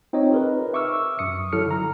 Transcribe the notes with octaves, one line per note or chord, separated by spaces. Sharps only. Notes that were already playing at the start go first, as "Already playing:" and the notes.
C4 D#4 F4 C#5 D#5
G#4 A#4 B4
E5 C#6 D6 E6 F6
F#2 C#6 D#6 C#7
G1 F#3 E4 A4 F6 C#7
D3 A#5